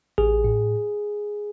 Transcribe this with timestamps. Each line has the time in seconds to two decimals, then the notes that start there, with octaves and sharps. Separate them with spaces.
0.18 A1 G#4
0.44 A2